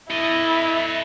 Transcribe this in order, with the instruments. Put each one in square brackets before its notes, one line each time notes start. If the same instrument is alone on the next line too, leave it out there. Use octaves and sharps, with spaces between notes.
[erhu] E4 [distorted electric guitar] A4 D#5